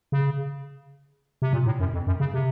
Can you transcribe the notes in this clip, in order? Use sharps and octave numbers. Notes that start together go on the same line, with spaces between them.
C#3
C3
A#2
A2
F#2
F2
F#2
C#3
C3